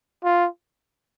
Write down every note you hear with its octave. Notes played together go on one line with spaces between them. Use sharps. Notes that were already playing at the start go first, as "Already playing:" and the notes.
F4